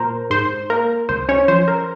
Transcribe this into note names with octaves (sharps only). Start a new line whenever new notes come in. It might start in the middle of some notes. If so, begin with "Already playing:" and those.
Already playing: A#2 A#4 C5
G#2 C5
A#3 A#4
C#2 C5
C#4 C#5
F3 C5
A#4